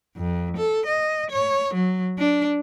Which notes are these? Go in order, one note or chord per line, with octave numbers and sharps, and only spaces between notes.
F2
A4
D#5
C#5
F#3
D4